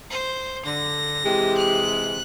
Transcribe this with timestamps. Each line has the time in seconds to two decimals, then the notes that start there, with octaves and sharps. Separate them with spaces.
0.10 C5
0.66 D3 A#6
1.25 C3 E3 G#3 G4
1.58 F#6